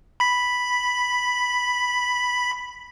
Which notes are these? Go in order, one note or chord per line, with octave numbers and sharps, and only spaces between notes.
B5 B6